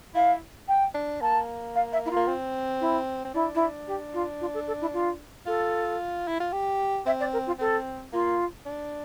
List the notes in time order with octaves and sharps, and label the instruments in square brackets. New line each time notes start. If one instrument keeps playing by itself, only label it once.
[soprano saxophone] E4 [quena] F5
[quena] G5
[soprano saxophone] D4
[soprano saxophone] A#3 [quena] A5
[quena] F5
E5
E4
F4
[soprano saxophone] A#3
C4
[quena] E4
[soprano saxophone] C4
[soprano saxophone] D4 [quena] E4
[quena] E4
G4
F4
F4
A4
A4
E4
F4
[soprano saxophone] F4 [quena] A4
[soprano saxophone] E4
F4
G4
[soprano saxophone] C4 [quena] E5
[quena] D5
A#4
F4
[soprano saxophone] C4 [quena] A4
[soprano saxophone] A#3 [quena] F4
[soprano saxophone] D4